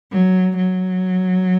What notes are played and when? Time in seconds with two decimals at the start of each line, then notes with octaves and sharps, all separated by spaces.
0.11 F#3
0.57 F#3